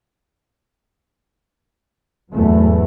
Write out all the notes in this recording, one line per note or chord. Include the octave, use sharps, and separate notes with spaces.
E2 G#2 E3 F#3 A3